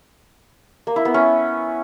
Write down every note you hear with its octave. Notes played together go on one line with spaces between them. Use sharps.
A#3
E4
B3
C#4